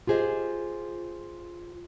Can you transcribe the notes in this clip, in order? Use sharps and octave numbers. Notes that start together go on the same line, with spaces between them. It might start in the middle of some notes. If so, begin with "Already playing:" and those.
F4 G4 G#4 C5 D#5